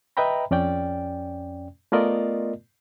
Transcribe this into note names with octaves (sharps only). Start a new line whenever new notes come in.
B4 D#5 E5 G5 A#5 B5
F2 C#4 D5 G5
A3 B3 F4 A#4 D5 D#5